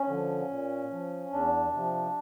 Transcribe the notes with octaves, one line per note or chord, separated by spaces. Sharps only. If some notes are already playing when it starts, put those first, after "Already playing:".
Already playing: C#4
D3 F3
A#2
F3
E2 D4
C3 F3